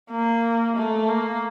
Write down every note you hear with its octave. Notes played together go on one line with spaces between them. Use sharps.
A#3
A3
A#3